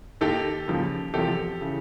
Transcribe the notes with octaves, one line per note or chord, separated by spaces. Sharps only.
D#2 D#3 G4 A4
D#2 C#3 F3
E2 C3 F3 G4 A4
C#3 E3